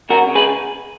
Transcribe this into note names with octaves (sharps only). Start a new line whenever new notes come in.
C#3 F#4 A#4
C#3
G#4 B4